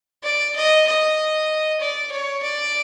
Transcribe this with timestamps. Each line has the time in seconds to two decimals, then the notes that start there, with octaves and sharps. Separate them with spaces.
0.23 D5
0.56 D#5
0.87 D#5
1.80 D5
2.11 C#5
2.42 D5